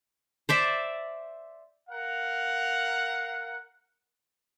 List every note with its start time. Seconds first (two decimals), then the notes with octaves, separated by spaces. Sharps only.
0.49 C5 D5 E5
1.90 A#4 F5 F#5